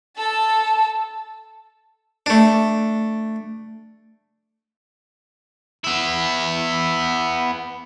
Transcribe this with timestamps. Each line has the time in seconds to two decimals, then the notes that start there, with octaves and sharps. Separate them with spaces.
0.17 A4 A5
2.26 A3 D4
5.84 B3 E4